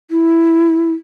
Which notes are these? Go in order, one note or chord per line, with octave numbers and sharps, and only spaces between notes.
E4